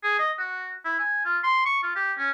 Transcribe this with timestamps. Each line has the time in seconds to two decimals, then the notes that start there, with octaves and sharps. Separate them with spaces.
0.03 G#4
0.19 D#5
0.39 F#4
0.85 E4
1.00 G#5
1.25 F4
1.43 C6
1.65 C#6
1.83 F4
1.96 G4
2.18 C#4